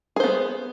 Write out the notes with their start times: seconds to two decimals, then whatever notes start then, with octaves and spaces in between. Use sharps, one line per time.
0.16 G#4
0.20 C5
0.24 B3